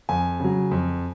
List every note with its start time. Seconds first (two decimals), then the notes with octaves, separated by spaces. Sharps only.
0.09 F2 G#5
0.40 C#3 F#3
0.71 F2